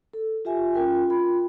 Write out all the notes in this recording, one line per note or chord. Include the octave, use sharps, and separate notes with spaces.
A4
F4 G4 E5 G#5
C#4 F4 A#4 G5
F4 B5